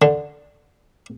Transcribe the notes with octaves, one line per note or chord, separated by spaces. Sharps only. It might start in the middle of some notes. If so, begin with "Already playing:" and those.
D3